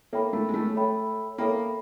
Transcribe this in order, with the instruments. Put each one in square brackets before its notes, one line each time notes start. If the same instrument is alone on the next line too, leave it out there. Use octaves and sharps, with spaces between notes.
[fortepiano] A#3 [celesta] A4 C#5 E5 G5 B5
[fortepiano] A3
G#3
A3
[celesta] A4 C#5 E5 G5 B5
[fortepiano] A#3 [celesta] A4 C#5 E5 G5 B5